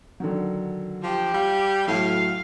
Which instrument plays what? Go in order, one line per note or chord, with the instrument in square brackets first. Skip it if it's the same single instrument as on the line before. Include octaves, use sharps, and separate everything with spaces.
[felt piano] D3 D#3 F#3
[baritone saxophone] F3 [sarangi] G4
[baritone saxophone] G3 [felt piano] F5
[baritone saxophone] A2 [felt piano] F#3 F#4 [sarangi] F5